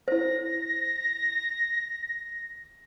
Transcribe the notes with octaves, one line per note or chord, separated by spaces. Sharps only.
E4 C5 A#6